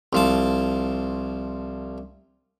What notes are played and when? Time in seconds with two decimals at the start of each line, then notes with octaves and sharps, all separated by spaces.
0.13 C2 F3 A5